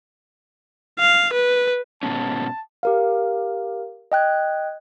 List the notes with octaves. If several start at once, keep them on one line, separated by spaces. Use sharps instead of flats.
F5
B4
G#2 B2 C#4 A5
G4 A#4 F5
D#5 G5 F#6 G#6